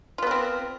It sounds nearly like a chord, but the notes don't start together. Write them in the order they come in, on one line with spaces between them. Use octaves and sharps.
F4 B3 A#4 C4